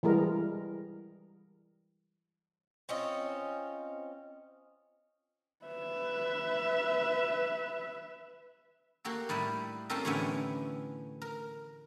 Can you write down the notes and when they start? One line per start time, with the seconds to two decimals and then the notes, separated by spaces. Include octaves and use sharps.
0.03 E3 G3 G#3 A#4
2.89 C4 C#4 F4 D#5
5.65 B4 E5
9.05 A#3 F#4 G4 A4
9.29 A2 G3 D#4 E4 E5
9.90 C4 C#4 F4 G4 A4 A#4
10.05 A2 D3 E3 B3 C#4 E4
11.22 A#4